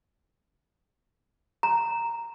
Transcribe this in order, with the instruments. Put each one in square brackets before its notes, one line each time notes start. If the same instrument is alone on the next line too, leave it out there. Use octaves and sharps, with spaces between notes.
[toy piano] A#5